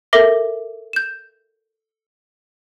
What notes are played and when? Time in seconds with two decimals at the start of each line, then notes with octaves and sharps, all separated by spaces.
0.13 A4 A#4 E5 D6 A#6 F#7
0.93 G6 E7